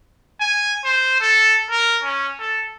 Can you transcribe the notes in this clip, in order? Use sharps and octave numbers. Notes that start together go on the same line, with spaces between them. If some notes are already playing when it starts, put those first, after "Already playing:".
G#5
C5
A4
A#4
C#4
A4